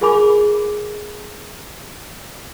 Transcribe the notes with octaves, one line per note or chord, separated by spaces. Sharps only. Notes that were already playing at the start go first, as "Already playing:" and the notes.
F4 G#4 A#4 G#5 B5 D6